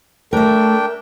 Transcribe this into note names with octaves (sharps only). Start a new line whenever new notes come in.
A3 D4 A#4 E5 G5